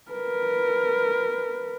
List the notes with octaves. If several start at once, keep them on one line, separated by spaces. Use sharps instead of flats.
A#4 B4